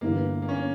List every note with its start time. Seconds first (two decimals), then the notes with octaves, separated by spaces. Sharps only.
0.01 G1 G2 E3 A#3
0.42 A#3
0.49 C#4